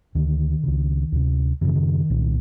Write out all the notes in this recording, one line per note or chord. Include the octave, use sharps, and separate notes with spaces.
D2 D3 D#3
C#2 C#3
D2 C3
F#2 C#3 D#3 E3
D#3
C2 A#2